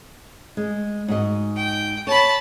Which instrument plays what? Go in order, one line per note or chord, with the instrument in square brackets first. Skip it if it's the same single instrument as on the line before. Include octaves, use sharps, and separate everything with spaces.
[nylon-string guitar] G#3
G#2 F#4 D#5
[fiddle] G5
[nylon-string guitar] C#5 [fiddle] A5 B5